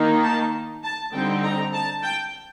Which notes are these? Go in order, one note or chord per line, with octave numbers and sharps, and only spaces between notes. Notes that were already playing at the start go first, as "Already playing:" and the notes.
Already playing: D#3 A#3 D#4
A5
A5
D3 G3 C4 D#4 G5
A#5
A5
G5